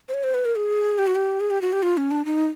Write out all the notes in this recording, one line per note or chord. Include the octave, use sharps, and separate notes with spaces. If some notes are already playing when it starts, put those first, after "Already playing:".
C5
C#5
C5
B4
A#4
G#4
G4
F#4
G4
G#4
G4
F#4
G4
F4
C#4
D4
D#4